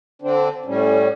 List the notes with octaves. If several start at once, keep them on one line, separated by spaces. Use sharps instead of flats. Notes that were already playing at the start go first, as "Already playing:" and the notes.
D3 C4 D4
A2 G3 C#4